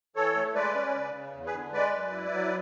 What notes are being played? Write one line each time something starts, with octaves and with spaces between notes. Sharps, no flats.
E3 A4 C#5
A3
G#3 B4 D5
C#4
C#3
C#3
E2
G#4 B4
D3
G#3 B4 D5
F#2
E4
F#3